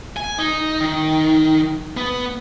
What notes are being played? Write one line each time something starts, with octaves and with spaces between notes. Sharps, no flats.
G#5
D#4
D#3
B3